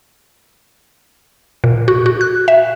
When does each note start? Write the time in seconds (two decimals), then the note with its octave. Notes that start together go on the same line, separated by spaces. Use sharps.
1.64 A#2
1.88 F#4
2.06 F#4
2.21 F#6
2.48 E5